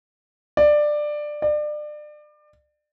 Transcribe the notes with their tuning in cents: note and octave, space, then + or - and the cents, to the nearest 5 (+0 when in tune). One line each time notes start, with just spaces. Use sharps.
D5 +15
D5 +30